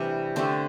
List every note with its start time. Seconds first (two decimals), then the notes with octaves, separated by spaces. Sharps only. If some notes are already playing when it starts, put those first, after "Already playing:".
Already playing: C3 E3 G3 A3 D4
0.36 D3 A3 C4 G4